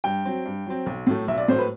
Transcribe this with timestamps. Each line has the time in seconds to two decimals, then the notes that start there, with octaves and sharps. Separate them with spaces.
0.04 G2 G5
0.25 F#3 C4
0.45 G2
0.66 F#3 C4
0.86 B1
1.07 A2 F#3 A3
1.28 B1 E5
1.38 D5
1.48 A2 F#3 A3 C5
1.59 B4